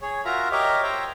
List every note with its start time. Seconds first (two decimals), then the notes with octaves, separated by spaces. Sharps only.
0.01 G#4 C#5
0.25 F4 F#4 A#4 E5 A#5
0.52 G4 A#4 C#5 D#5 E5
0.83 C5 C#5 E5 G5 A#5